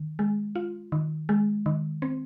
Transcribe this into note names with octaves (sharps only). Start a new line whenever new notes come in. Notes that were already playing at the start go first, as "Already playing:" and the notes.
Already playing: D#3
G#3
F4
D#3
G#3
D#3
C4